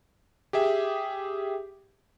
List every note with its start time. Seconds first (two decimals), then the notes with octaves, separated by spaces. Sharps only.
0.53 G4 G#4 E5